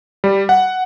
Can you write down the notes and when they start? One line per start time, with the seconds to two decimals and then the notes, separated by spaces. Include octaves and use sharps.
0.24 G3
0.49 F#5